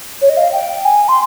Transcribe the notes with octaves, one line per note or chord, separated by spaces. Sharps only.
C#5
D#5
F5
G5
G#5
C6